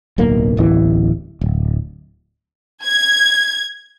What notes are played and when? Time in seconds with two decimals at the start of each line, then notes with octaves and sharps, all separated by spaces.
0.18 D1 B1 A#3
0.57 D1 A1 E2 E3
1.41 D1
2.84 G#6